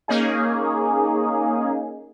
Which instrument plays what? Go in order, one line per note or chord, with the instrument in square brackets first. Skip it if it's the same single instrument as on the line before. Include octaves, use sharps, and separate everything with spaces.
[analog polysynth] A#3 C#4 D#4 G#4